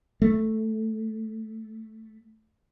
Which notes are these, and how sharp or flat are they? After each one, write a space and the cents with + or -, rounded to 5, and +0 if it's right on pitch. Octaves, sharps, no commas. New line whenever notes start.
A3 +0